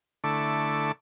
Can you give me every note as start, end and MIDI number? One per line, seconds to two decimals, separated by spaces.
0.24 0.92 50
0.24 0.92 57
0.24 0.92 64
0.24 0.92 81
0.24 0.92 85
0.24 0.92 86